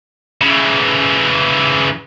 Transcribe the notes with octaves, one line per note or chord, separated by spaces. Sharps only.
C#3 E3